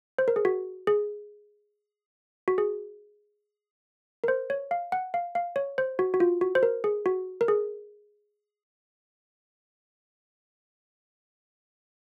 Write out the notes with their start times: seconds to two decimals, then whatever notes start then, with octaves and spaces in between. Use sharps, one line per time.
0.18 C5
0.28 A#4
0.36 G#4
0.45 F#4
0.87 G#4
2.48 F#4
2.58 G#4
4.24 A#4
4.28 C5
4.50 C#5
4.71 F5
4.92 F#5
5.14 F5
5.35 F5
5.56 C#5
5.78 C5
5.99 F#4
6.14 F#4
6.20 F4
6.41 F#4
6.55 C5
6.63 A#4
6.84 G#4
7.06 F#4
7.41 A#4
7.48 G#4